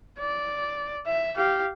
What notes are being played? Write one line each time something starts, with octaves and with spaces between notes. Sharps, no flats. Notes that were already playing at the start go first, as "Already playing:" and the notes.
D5
E5
G4 F5